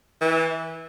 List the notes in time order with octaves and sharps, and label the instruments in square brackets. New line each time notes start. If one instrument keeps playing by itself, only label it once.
[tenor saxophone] E3